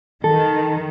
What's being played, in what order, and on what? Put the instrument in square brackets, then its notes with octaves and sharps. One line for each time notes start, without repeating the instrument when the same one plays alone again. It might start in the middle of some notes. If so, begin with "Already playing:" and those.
[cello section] D#3 [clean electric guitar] A4